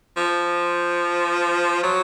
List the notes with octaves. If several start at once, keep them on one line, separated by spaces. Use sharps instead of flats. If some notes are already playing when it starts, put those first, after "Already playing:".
F3
F#3